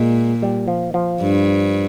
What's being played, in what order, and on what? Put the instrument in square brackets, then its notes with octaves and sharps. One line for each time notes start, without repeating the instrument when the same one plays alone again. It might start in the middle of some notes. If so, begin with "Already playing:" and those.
Already playing: [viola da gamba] A#2 [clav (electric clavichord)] G#3
[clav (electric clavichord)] G3
F3
F3
[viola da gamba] G2